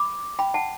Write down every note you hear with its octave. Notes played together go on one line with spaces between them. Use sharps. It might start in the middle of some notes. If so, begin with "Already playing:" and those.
Already playing: B5 D6
G5 B5
F#5 A5